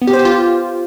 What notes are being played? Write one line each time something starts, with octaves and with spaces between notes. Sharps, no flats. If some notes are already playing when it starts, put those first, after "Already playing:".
B3
G4
C5
G4
F4